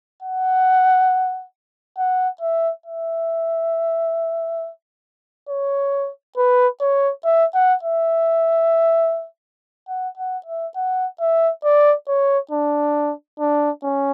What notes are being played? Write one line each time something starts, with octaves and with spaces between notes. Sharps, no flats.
F#5
F#5
E5
E5
C#5
B4
C#5
E5
F#5
E5
F#5
F#5
E5
F#5
E5
D5
C#5
D4
D4
C#4